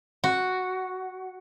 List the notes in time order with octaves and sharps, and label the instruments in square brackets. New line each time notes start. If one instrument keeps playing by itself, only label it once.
[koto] F#4